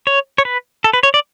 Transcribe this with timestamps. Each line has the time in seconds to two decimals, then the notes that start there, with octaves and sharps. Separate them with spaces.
0.07 C#5
0.38 C#5
0.45 B4
0.84 A4
0.93 B4
1.03 C#5
1.14 D5